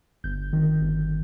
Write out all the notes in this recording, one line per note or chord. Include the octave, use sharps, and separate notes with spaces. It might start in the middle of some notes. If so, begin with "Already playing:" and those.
G1 G6
D#3
G1